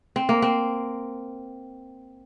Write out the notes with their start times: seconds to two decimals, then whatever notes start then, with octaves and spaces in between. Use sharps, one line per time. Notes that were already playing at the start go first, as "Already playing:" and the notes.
0.16 C4
0.29 A#3
0.42 C4